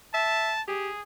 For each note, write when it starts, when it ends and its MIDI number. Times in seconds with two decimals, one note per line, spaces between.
0.14 0.52 76
0.14 0.61 81
0.68 0.89 67
0.68 1.02 68